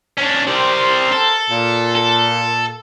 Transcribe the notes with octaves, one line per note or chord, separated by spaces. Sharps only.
C#4 D4
C4 G4 A#4 C5 D5
A4
A#2
A4